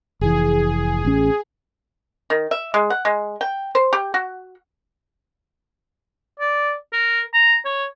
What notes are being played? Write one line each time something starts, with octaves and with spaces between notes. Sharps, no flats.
F1 E3 G#4
A1 C#4
D#3
E5
G#3
F#5
G#3
G5
C5
G4
F#4
D5
A#4
A#5
C#5